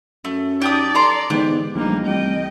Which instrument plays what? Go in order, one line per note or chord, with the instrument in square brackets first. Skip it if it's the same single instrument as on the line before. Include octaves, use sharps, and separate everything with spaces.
[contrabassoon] F#2 [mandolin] A3
[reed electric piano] D#4 A5 [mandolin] G4 G5 D#6 [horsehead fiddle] D5
[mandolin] A4 A#5 C6
[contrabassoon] G#2 [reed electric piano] D3 E3 B3 [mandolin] G4 F#6
[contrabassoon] A#1 [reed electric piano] E3 G3 A3 [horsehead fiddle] A#3 D#4
[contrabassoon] C2 [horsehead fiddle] D#5 G5